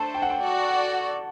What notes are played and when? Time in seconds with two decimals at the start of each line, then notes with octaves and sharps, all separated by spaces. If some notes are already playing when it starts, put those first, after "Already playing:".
Already playing: A3 D4 A4 C5 A5
0.14 G5
0.22 F#5
0.30 G5
0.39 F#4 A4 D5